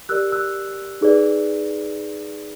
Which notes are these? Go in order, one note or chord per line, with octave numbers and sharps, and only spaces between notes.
G4 A#4 D5 E6 F#6
E6 F#6
D#4 G#4 B4 D5